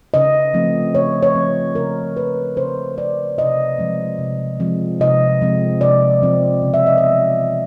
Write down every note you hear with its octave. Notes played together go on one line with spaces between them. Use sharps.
C#3 D#5
F3 A3 C4
C#3 C#5
C#5
F3 A3 C4
C#3 A#4
F3 A3 C4 B4
C#3 C5
F3 A3 C4 D5
C3 D#5
F3 G#3 C4
C3
F3 G#3 C4
C3 D#5
F3 G#3 C4
C3 D5
F3 G#3 C4
C#3
E5
D#5
E5
E3 G#3 B3
C#3